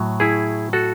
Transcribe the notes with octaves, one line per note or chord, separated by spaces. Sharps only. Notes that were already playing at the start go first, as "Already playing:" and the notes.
Already playing: A2 F#3
E4 G#4
F#4 A4